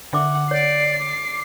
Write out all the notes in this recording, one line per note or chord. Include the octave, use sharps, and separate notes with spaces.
D3 E5 F#5 D6
C#5 D5 C7
D6